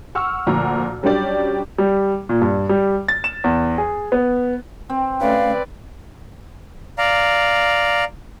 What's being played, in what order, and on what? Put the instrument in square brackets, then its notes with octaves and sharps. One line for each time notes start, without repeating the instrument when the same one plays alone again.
[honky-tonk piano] F#5 C#6 E6 F6
D2 A#2 F3 F#4 A#5
F#3 G3 C#4 D4 G4 D5
[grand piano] G3
A#2
G2
G3
A6
E7
E2
G#4
B3
[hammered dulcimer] C4
[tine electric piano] A3 C#4 [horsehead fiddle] B4 D5 [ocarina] F5
[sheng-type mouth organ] D5 F5 A#5